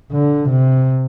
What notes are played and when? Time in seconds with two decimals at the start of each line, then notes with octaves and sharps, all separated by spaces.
0.12 D3
0.49 C3